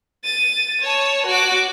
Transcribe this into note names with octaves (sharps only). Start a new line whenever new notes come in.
A6 D#7
C#5 A5
F#4 D6